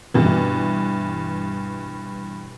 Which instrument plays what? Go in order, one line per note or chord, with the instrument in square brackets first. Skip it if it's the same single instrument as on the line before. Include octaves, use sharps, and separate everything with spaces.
[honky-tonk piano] G2 E3 [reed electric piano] B2